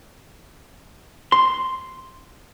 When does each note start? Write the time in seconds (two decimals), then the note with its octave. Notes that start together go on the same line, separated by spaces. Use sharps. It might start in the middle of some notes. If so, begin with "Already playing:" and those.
1.32 C6